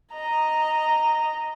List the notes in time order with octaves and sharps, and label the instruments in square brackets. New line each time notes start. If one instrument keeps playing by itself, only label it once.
[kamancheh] D#5 A#5